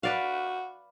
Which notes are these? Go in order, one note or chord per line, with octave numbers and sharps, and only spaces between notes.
F#4 B4 D5 F5